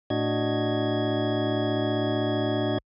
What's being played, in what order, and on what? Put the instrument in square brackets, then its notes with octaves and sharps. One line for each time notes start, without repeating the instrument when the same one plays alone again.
[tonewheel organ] A2 D4 F#4 D#5 G#6